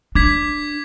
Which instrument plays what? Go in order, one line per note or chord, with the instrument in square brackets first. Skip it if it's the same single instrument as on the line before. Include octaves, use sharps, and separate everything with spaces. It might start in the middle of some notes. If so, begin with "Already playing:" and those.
[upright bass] D4 [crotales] D6 G#6 B6